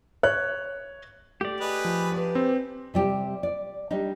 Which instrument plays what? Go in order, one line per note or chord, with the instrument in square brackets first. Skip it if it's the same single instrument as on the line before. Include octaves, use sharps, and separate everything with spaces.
[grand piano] C#5 F#6
[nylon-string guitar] A3 [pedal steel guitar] G4 D5
[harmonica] G#4 B4 D#5
[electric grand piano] F3
[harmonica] D4 [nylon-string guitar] B4 G#5
[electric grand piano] C4
[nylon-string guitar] C3 G3 G4
D5
G3 D4 D#4